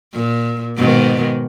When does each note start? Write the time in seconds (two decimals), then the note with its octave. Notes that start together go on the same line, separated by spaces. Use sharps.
0.13 A#2
0.76 G#2 B2 D#3